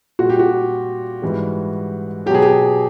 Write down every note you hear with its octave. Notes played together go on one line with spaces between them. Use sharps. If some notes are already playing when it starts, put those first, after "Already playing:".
A#2 G3 F#4
G4
F#4
G#2 E3 G3
B2 F#3 G4 G#4
G4